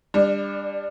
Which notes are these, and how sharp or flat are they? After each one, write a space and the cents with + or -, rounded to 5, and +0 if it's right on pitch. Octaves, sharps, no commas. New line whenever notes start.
G3 +30 D4 +0